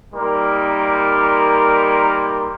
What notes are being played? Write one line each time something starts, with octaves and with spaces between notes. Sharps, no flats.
G3 A#3 D#4 A#4 C6